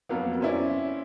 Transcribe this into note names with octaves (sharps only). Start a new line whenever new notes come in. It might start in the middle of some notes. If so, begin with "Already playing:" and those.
F2 F#3 A#3 B3
C4 C#4 E4 D5